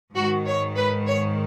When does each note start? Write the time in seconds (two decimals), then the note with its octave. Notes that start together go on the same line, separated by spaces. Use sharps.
0.15 G#2 D#3 F#4
0.47 C#5
0.76 B4
1.07 C#5